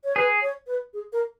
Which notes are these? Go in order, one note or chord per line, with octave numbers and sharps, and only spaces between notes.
C#5
G#4 B4
C#5
B4
G#4
A#4